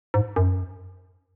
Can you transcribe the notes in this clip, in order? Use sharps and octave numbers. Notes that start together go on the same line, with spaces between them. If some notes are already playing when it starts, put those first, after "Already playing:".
G#2
F#2